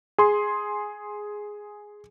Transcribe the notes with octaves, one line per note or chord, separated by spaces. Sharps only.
G#4 C6